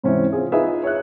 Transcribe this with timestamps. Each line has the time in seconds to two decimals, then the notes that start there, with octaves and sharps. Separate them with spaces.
0.04 G#2 C3 E3 C4 C#4
0.32 C4 F4 G#4
0.52 D#4 F4 G#4 B4 E5 F5
0.84 C#5 E5 F#6